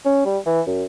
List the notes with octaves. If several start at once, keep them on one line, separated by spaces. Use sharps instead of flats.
C#4
G3
E3
F#2